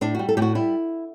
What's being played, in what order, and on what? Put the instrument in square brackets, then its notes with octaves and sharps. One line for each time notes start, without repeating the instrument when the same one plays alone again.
[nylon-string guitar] A2 D4
G3 F#4
A4
A2 F#4 G4
G3 E4